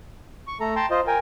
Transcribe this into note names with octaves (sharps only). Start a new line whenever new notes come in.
C#6
A3 A4 A#5
G5 A5 A#5 C6
F4 C5 D#5
A#4 G5 G#5